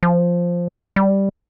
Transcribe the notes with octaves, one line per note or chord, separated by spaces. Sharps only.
F3
G3